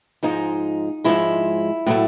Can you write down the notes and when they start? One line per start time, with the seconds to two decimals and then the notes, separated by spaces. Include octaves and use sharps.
0.23 G#2 F3 G#3 D#4
1.04 G#2 F3 G#3 E4
1.86 A2 F#3 A3